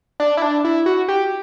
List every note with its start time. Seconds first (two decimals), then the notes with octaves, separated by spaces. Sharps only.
0.20 D4
0.37 E4
0.42 D4
0.65 E4
0.86 F#4
1.08 G4